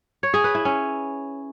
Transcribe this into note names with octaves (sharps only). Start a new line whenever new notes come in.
C#5
G#4
B4
E4
C#4